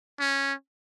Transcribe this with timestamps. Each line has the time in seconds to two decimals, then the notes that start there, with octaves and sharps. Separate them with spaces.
0.19 C#4